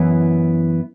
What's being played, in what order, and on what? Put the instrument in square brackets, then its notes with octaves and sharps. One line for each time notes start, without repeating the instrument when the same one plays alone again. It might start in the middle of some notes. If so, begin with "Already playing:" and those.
Already playing: [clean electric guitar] F#2 E3 B3 E4